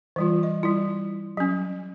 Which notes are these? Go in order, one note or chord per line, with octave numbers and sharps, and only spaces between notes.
E3 G3 F4
D#5
G3 E4
F#3 C#4